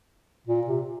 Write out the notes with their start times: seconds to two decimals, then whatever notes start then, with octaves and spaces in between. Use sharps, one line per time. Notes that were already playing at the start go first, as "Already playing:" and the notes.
0.47 A#2
0.67 C3